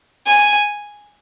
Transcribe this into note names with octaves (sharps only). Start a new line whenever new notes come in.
G#5